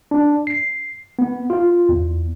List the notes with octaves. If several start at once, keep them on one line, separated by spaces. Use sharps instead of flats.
D4
C7
B3
F4
E2